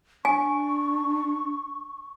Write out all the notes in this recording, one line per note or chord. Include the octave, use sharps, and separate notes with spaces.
D4 G#5 C#6